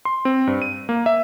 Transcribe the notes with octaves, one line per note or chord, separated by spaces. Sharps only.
C6
C4
G2
D#7
A#3
E5